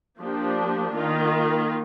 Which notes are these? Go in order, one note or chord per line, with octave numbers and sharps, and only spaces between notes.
F3 A#3 D4 G4
D#3 A#3 F4